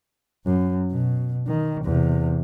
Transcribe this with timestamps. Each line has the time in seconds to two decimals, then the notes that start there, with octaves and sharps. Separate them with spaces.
0.46 F#2
0.91 B2
1.47 D#3
1.84 E2 C3